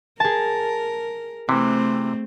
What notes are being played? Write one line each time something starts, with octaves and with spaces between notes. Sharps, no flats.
G#4 A#4 A5
C3 E3 A3 C4